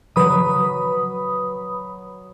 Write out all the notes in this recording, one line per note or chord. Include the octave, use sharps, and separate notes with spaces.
F#3 B4 B5 D#6